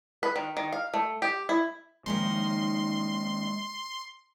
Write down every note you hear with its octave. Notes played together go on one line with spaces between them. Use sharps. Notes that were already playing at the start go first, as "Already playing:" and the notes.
B4
D#3
D#3
F5
A3
G4
E4
D#3 F3 G#3 A#3 C#4 D#4 C6